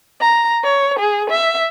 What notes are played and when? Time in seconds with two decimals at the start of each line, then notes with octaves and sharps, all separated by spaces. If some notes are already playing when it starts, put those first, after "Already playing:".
0.19 A#5
0.61 C#5
0.97 G#4
1.29 E5